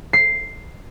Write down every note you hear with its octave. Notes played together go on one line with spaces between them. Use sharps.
C7